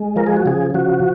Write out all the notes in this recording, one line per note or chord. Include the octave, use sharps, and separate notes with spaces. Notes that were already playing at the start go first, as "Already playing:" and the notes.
Already playing: G#3
F3 A#4
G#4
F#4
C#3 G#4
F3 F#4